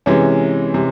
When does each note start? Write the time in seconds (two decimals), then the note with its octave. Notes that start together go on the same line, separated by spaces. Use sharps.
0.06 C3 E3 G#3 C#4
0.74 C3